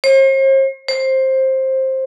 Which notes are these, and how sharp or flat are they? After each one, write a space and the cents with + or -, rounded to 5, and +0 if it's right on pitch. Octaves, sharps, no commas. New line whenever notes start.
C5 +45
C5 +15